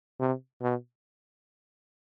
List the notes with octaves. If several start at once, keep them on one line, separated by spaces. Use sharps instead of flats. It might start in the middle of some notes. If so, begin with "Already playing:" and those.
C3
B2